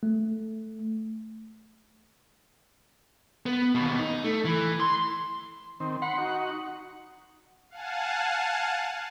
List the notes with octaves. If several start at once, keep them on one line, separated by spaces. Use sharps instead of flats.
A3
B3
D#2 B2
D#4
A3
E3
C6
D#3 C4
F#5 B5 C6
D#4 F#4
F5 F#5 G#5 A5